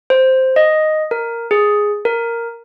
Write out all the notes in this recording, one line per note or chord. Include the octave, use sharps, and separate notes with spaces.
C5
D#5
A#4
G#4
A#4